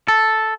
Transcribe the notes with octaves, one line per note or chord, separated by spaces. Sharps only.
A4